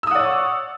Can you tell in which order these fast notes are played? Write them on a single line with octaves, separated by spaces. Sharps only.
E6 D#6 F#5 D5 C#5